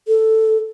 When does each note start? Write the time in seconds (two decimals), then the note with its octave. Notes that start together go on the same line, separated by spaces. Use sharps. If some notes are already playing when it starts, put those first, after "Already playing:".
0.08 A4